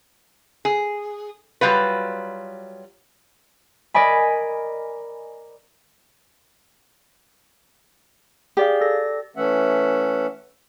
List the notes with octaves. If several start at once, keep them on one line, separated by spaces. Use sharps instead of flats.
G#4
F#3 G3 F4 B4
A#4 D5 D#5 G#5 B5
G4 G#4 D5 F5
A4 D5 A#6
E3 A3 C#4 E5 F#5